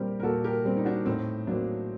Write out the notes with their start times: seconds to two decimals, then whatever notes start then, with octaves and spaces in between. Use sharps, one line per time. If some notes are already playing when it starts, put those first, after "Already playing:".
Already playing: A#2 G3 C4 G4 A#4
0.20 A#4
0.23 A#2 F#4 A4
0.44 G4 A#4
0.65 G3 C4
0.77 D#4
0.85 D4 F#4
1.06 A2 C4 D#4
1.47 F#3 A#3 C4 D4